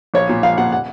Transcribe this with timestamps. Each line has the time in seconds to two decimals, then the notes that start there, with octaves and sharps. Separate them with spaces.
0.14 A#1 C#5
0.29 A#2
0.43 A#1 F5
0.58 A#2 F#5
0.72 F#5